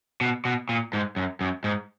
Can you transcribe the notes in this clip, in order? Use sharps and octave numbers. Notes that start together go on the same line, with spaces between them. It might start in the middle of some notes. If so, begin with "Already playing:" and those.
B2
B2
A#2
G#2
F#2
F#2
G#2